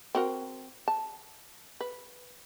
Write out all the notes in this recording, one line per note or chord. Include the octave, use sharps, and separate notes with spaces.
C4 F#4 A#4
A5
B4